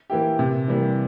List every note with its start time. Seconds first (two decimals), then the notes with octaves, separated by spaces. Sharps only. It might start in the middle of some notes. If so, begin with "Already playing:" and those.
0.10 E3 A#3 E4 G4
0.39 C3
0.68 E3 G3 A#3